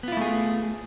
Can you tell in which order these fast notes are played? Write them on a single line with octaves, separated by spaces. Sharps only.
B3 F4 E4 A3 G#4